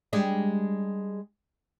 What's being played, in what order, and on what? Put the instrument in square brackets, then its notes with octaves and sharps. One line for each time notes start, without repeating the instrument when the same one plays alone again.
[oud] G3 G#3 D4